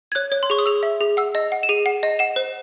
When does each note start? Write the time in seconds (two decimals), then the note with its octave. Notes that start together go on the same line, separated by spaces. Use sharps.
0.12 G#6
0.15 C#5 F#6
0.32 C#5
0.43 C6
0.50 G#4 C#6
0.58 D#6
0.66 G#4 E6
0.83 E5
1.01 G#4
1.17 F#5 E6
1.35 D#5
1.52 F#5
1.63 E7
1.69 G#4 D#7
1.86 F#5
2.03 D#5
2.19 F#5 E7
2.36 C5